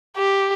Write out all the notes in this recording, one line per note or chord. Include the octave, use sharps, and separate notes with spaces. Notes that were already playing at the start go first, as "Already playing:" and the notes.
G4